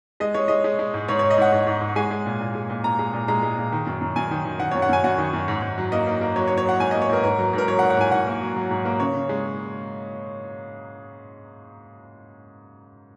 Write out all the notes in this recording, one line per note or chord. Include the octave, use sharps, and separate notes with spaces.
G#3 D#5
G#3 C#5
G#3 D#5
G#3
G#3
G#2
G#2 C#5
G#2 C#5
D#5
G#2 F#5
G#2
G#2
G#2
G#3 G#5
G#3
A#2
A#2
G#3
A#2
A#2 A#5
G#3
A#2
G#3 A#5
G#3
A#2
D#3
F#2
F#2
F#2 G#5
D#3
D#3
D#3 F#5
F#2 C#5
F#5
F#2 G#5
F#2 F#5
D#3
F#2
G#2
G#2
F#3
A#3 D#5
A#3
A#3
F#3 C#5
C#5
F#3
C#5
F#3 F#5
G#2 G#5
A#3 D#5
C#5
G#2 A#4
G#2 A#4
F#3
G#2 A#4
F#3 C#5
F#5
G#2
F#5
G#2 G#5
G#2 F#5
A#3
F#3
F#3
G#2
A#3
C#3 C#5
C#3
G#3